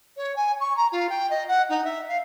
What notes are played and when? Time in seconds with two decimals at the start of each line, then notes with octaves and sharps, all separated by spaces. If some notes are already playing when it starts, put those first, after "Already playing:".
0.17 C#5
0.36 G#5
0.60 C#6
0.77 A#5
0.92 F4
1.09 G5
1.30 D#5
1.48 F#5
1.69 D#4
1.84 E5
2.08 F5